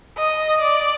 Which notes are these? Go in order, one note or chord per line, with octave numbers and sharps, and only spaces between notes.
D#5
D5